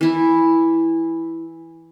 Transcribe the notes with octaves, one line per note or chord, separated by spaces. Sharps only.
E3 E4